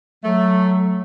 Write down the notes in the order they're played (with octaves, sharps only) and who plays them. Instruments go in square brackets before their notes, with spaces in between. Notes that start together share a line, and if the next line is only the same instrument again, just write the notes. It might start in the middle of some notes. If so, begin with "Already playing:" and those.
[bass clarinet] F#3 [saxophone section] A3